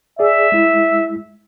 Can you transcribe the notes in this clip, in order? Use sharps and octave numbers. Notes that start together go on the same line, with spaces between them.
G#4 D5 E5
G#3 E4